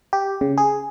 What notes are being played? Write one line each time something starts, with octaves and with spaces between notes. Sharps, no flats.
G4
C#3
G#4